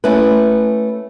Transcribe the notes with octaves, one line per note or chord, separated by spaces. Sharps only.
A3 C#4 E4 B4